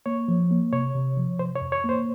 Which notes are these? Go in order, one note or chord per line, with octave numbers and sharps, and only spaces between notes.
A#3 C#5
F3
A#3
C3 C#5
C3
F3
C3 C5
C#5
F2
C#5
A#3
C5